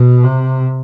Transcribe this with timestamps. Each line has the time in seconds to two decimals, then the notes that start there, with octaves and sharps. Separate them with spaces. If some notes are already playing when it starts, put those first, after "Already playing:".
Already playing: B2
0.24 C3